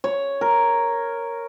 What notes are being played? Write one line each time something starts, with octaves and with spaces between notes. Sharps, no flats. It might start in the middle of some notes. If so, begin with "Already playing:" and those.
C#5
A#4